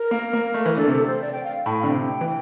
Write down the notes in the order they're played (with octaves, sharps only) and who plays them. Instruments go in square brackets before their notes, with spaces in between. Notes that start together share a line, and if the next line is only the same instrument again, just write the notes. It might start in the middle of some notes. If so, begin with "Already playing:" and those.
Already playing: [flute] A#4
[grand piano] A#3
A#3
A3
E3
[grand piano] D3 [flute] A4
[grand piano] C3 [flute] A4
[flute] C5
D5
G5
F5
[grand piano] A2 [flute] A5
[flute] G5
F5
[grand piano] D3
[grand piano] C3 [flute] G5
[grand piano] E3